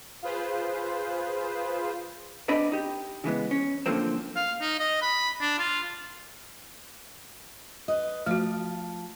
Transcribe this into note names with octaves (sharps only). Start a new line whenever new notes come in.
F4 G#4 B4 C5
B3 C4 D4 D5 D#5 B5
D#4 G4
C#3 E3 G#3 B3
C#4
D3 F3 F#3 A3 A#3 C4
F5
D#4
D#5
B5
D4
F4
B4 D#5
F3 A3 F#4